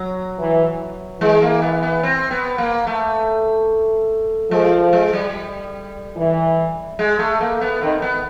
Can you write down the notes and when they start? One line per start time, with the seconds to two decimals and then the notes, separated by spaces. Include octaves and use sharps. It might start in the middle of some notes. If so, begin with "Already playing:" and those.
Already playing: F#3
0.39 E3
1.21 E3 G#3
1.42 A#3
1.62 B3
1.82 B3
2.03 C4
2.31 B3
2.58 A#3
2.87 A3
4.51 F3 G#3
4.93 G#3
5.13 G3
6.16 E3
6.99 G#3
7.19 A3
7.40 A#3
7.61 B3
7.81 D#3 C4
8.02 B3